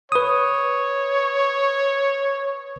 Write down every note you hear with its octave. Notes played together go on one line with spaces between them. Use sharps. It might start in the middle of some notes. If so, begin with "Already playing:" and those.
B4 C#5 D#6